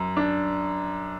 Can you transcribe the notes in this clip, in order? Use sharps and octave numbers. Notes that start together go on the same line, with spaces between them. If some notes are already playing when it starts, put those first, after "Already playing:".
Already playing: F#2
D4